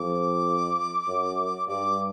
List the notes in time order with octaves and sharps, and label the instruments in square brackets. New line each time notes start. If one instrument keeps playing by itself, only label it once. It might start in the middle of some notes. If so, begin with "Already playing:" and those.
Already playing: [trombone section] F2 [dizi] D6
[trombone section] F#2
[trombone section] G2 [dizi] D6